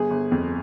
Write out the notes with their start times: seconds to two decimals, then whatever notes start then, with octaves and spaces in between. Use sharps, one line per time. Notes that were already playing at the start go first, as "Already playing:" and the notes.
Already playing: G1 G#4
0.10 G1
0.31 F2